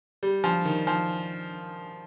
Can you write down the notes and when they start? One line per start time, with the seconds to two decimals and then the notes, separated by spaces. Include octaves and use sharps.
0.23 G3
0.44 F3
0.65 D#3
0.87 F3